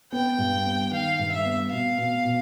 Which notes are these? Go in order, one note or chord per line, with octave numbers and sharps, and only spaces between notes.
B3 G5
G2
B3
D#3 F5
G2
E5
B3
B2 F5
B2
B2